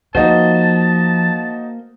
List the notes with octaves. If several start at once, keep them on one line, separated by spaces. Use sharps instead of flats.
F3 A#3 D#4 F#4 C5 A5